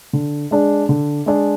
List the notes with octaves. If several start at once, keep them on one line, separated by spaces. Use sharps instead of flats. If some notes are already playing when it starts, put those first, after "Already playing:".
D3
G#3 D4 G#4 D5
D3
G#3 D4 G#4 D5